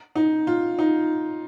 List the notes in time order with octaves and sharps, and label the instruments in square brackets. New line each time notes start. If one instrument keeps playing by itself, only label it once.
[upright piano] D#4
F4
D#4